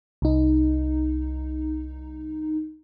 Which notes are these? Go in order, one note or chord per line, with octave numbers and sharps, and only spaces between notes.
C2 D#4